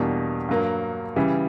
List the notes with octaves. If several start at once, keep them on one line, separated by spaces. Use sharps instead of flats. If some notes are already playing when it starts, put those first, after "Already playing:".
Already playing: E2 B2 G3 A#3 D4
G2 F#3 A#3
C#3 E3 G3